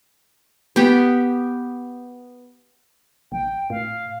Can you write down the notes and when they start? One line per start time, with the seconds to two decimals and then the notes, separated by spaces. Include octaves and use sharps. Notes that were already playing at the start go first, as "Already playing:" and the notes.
0.76 B3 G4
3.32 A1 G5
3.70 A2 F5